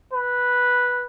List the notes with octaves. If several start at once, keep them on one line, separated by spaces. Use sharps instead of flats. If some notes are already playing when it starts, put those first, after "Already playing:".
B4